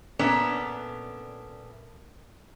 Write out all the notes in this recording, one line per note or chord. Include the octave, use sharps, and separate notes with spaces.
A#2 A3 B3 C#4 D4